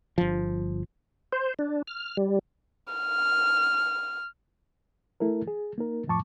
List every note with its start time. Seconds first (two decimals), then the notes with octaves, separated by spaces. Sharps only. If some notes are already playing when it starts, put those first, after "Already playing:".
0.18 G1 F3
1.33 C5
1.59 D4
1.87 F6
2.17 G3
2.93 F6
5.20 A3 E4 A4 A#4
5.48 G#4
5.78 A#3 D#4 A#4
6.07 F2 A2 F3 A5 C#6 D6